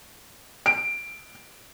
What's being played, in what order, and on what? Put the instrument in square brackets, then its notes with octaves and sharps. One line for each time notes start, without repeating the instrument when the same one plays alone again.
[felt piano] D7